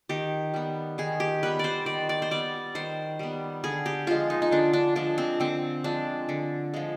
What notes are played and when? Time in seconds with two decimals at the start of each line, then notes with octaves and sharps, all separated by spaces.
0.09 D#3 G4
0.54 G3 B3
0.98 D#3 G#4
1.20 G4
1.43 G3 B3 B4
1.59 C5 D5
1.86 D#3 D5
2.09 D5
2.22 C5
2.31 G3 B3 D5
2.75 D#3 C5
3.19 G3 B3
3.64 D3 G#4
3.86 G4
4.07 F3 G#3 F4
4.30 D#4
4.42 D#4
4.51 D3 D4
4.73 D4
4.96 F3 G#3 D4
5.18 C4
5.40 D3 C4
5.84 F3 G#3 D4
6.29 D3
6.74 F3 G#3